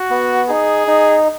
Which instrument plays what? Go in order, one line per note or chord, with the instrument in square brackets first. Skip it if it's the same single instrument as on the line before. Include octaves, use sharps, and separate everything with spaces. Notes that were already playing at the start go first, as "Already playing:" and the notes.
Already playing: [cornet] F#4
[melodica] B3
[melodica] D#4 [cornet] G#4
[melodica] D#4